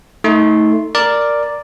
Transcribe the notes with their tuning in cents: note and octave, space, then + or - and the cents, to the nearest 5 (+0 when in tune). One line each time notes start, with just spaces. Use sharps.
A3 +0 D#4 +30 C6 +0
A#4 +0 D5 +0